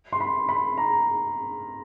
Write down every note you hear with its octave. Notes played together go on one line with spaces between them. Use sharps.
C6
B5
B5
A#5